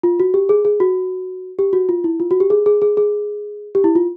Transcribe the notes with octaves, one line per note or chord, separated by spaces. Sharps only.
F4
F#4
G4
G#4
G#4
F#4
G4
F#4
F4
E4
F4
F#4
G4
G#4
G#4
G#4
G#4
G4
E4
F4